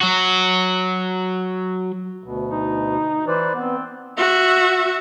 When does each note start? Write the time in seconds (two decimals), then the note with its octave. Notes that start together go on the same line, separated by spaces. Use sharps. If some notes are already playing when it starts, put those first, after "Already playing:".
0.01 F#3 F#4
2.24 D2 B2
2.51 D#4
3.27 E3 B4 C5 D5
3.55 B3 C4
4.17 F#4 E5